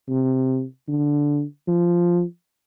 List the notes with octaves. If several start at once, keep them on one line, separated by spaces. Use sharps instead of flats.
C3
D3
F3